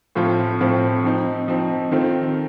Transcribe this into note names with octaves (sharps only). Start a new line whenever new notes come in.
A2 F3 C4 F4
A2 F3 C4 F4
F3 C4 D#4
F3 C4 D#4
D#3 A3 C4 F4